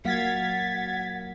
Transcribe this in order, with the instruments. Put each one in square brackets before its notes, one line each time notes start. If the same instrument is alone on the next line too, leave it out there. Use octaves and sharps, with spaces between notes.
[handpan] F#3 A#3 F5 [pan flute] F#5 [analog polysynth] G#6 A6 B6